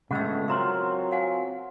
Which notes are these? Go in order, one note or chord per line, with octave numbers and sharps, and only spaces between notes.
G1 C#3 G#3 A3 F#5 G5 E6
F#3 C4 F4 A#4 E5 A#5 C6
F5 F#5 G#5